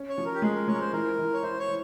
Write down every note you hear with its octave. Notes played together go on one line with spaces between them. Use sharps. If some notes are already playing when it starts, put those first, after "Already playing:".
Already playing: C#4
C#5
F3
A#4
G4
G#3 G#4
A#4
G#3 C#5
A#4
C5
E3 A#4
E3
C#5
E4 C5
C#5
E3